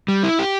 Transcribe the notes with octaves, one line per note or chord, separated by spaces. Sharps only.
G3
E4
G4